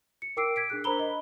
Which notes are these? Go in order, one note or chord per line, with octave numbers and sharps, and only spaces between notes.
C#7
A#4 G5 D6 E6 C7 D7
G#6 B6 D7
D4 G#4 F#6
D4 A#4 C5 A#5 B5 G7
D#5